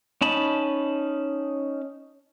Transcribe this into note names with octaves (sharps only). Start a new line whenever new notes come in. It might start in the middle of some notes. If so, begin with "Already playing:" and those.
C#4 D#4 A5 B5